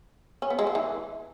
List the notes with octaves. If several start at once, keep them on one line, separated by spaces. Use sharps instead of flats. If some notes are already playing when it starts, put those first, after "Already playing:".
C#4
B3
G#3
F3
E3